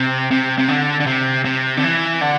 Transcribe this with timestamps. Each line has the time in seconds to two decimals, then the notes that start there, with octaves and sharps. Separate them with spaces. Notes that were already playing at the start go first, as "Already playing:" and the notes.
Already playing: C3
0.31 C3
0.58 C3
0.68 D3
1.00 D3
1.06 C3
1.45 C3
1.77 D3
1.84 E3
2.21 D3